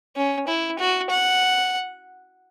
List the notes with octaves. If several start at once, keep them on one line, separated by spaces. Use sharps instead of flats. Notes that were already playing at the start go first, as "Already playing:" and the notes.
C#4
E4
F#4
F#5